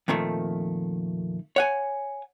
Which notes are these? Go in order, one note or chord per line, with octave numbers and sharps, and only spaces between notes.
F2 A#2 D#3 F3 A3
C#5 F#5 G#5